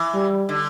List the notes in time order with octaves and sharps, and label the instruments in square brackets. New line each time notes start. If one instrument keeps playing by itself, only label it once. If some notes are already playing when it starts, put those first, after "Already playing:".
Already playing: [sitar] E3
[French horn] G3
[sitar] D3